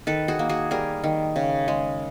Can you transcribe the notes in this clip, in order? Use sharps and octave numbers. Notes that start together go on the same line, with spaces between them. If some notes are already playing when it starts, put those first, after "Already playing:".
D#3 A4 B4
F#4 G#4
A#3
F#4 G#4
G3 G#4 A#4
D#3
C#3
G#3